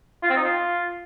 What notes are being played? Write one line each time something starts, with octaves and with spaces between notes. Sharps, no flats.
F4
C4
D#4
F4